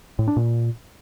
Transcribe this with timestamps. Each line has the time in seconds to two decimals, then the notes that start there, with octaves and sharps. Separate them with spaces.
0.19 A2
0.28 D4
0.37 A#2